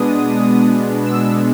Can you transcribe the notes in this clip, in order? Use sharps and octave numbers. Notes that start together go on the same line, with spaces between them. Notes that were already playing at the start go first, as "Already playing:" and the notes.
Already playing: B2 G#3 B3 D4 D#6
E6